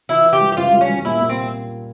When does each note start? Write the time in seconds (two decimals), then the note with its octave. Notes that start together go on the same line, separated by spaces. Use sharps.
0.09 E3 E4
0.25 E3
0.33 G4
0.41 G3
0.52 G4
0.57 C#2 F4
0.73 G3
0.81 C#4
0.89 G3
1.05 A#2 E4
1.21 A#2
1.29 C4